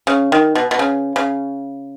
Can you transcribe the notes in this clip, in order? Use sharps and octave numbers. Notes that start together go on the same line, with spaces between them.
C#3
D#3
B2
B2
C#3
C#3